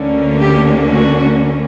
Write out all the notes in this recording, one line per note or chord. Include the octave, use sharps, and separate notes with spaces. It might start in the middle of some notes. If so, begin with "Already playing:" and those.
Already playing: D2 D3 A#3 C#4
G4
F#4